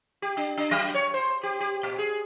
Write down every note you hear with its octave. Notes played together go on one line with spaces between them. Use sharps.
G4
D4
D4
F#3
C#5
C5
G4
G4
A#2
G#4